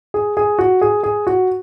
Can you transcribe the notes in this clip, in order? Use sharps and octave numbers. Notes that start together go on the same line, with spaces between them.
G#4
G#4
F#4
G#4
G#4
F#4